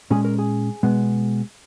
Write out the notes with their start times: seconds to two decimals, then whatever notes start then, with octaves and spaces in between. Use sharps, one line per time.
0.10 A#2 G#3 C#4 G#4
0.25 A#4
0.39 G#4
0.83 B2 G#3 B3